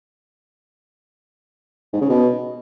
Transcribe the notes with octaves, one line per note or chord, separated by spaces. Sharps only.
G#2
C#3
B2